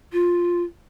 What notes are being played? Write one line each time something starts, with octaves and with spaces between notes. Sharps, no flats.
F4